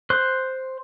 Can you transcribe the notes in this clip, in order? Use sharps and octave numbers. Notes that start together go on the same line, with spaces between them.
C5 F#6